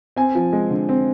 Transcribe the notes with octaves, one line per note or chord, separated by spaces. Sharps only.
C4 G#5
F3
G#3
D3
C4